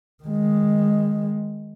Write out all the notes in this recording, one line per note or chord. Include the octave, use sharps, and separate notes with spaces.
D#3 G#3